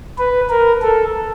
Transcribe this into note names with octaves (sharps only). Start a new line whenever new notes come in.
B4
A#4
A4